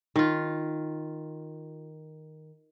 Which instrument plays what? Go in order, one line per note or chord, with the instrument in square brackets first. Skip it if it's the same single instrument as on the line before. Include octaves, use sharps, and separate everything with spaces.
[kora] D#3 F4